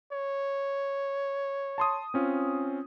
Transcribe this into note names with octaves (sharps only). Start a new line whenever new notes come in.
C#5
A5 C6 D#6
C4 C#4 F4